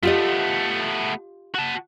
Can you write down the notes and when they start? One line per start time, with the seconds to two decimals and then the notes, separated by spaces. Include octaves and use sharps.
0.03 A3 B3 F4 G4 D#5
1.54 F#4 A5